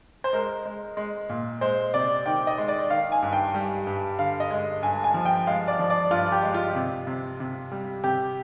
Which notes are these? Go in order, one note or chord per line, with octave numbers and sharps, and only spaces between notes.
C5
G#3 A#4
G#3
G#3
A#2
G#3 C5
C3 D5
D#3 G5
D#5
G#3
D5
D#3 F5
G#5
G2
G5
G3
G2
D3 F5
D#5
G#3
G2 G#5
G#5
F3
G5
G#3 F5
D5
F3
D5
G2 F4
G4
G#3
F4
C3
C3
C3
G3
C3 G4